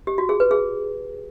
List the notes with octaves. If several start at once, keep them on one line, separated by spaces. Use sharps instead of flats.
G4
F#4
G#4
B4
G#4